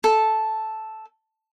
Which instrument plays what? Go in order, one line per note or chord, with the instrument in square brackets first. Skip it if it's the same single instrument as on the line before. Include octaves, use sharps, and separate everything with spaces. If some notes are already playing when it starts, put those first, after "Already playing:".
[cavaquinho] A4